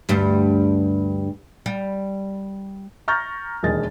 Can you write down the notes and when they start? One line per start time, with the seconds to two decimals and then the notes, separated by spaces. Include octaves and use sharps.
0.09 D2 G2 G3
1.66 G3
3.08 A#5 C#6 F6 G6 A6 A#6
3.63 E1 D#2 G#4 D#5 A6